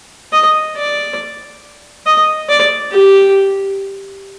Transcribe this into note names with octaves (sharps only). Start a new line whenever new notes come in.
D#5
D5
D#5
D5
G4